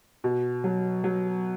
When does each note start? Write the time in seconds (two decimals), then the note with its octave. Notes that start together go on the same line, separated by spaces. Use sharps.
0.24 B2
0.64 F#3
1.04 F#3